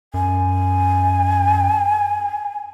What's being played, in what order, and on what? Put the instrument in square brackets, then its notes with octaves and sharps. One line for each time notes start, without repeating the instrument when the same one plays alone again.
[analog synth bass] F#2 [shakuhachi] G#5